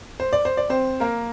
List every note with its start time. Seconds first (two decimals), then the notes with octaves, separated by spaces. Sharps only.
0.20 C5
0.33 D5
0.45 C5
0.57 D5
0.70 C4 C5
1.00 A#3 A#4